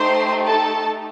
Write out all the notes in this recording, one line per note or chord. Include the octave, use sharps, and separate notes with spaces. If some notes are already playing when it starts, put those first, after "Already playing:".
Already playing: A3 D#4 G4 C5 C6
A4 A5